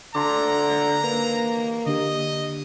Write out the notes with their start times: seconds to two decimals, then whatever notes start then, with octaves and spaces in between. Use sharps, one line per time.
0.15 D3 A5 A#5 C6 D6
1.04 A#3 B4
1.86 D3 D4 G4 D#5